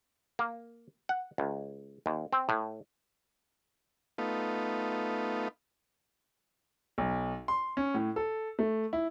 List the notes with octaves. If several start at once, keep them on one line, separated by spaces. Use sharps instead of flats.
A#3
F#5
C#2
D#2
C4
A2
A3 B3 D#4 F4
B1
C6
C#4
A2
A4
A3
E4